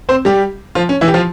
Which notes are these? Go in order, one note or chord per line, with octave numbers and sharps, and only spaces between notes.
C4 C5
G3 G4
F3 F4
C#4
E3 E4
G4
F3 F4